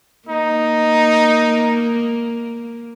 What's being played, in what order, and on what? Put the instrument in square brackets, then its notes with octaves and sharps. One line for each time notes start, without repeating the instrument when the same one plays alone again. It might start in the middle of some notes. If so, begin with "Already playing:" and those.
[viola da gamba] A#3 [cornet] D#4